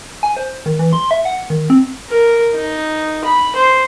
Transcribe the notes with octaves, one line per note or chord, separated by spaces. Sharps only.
G#5
C5
D#3
E3
C6
E5
F#5
D#3
C4
A#4
D#4
B5
C5